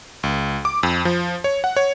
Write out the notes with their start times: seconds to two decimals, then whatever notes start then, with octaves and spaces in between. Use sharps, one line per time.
0.23 C#2
0.65 D6
0.83 F2
1.05 F3
1.44 C#5
1.64 F#5
1.77 C#5